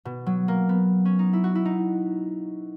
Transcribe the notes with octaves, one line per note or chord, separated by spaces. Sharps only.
B2
F#3
A#3
B3
C#4
D#4
E4
F#4
E4
D#4